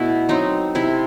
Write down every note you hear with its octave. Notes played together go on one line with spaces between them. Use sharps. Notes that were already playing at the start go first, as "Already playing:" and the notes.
Already playing: B2 A3 E4
F#3 C4 D#4
C3 E4